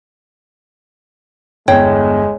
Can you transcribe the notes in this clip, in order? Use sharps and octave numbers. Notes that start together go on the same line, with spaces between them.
G1 E2 G#3 C#5 G5